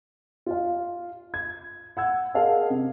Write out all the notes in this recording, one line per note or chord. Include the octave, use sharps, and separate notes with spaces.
F4 F5
G#6
F#5 E6 G#6
G#4 A#4 D#5 F5 F#5 A5
C3